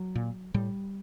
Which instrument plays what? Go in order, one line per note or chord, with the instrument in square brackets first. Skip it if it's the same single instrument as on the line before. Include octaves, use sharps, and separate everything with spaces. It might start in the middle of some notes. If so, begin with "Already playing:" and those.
Already playing: [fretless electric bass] F#3
A#2
A2 G3